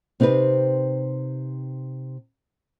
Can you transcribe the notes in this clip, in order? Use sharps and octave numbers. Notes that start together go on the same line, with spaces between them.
C3 C4 D#4 G4 B4